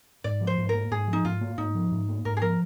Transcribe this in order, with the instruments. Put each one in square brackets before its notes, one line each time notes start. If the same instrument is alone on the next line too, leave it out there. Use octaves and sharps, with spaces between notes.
[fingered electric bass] G#2 [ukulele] D5
[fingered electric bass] F3
[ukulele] C5
[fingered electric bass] G#2
[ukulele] A#4
[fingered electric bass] A#3
[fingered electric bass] G#2 [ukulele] G#4
[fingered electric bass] F3
[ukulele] D#4
[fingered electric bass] G#2 [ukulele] F4
[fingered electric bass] A#3
[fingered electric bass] G#2 [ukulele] D#4
[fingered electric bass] F3
G#2
A#3
[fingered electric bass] G#2 [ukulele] A#4
[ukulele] G#4
[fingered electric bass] F3 [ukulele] A#4